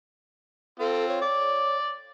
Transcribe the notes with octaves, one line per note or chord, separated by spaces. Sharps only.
C4 F4 A4
C#5
D5